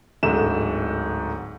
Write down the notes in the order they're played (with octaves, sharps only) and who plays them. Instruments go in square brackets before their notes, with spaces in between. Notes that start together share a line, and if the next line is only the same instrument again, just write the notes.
[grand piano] D1 G#2 D3 E7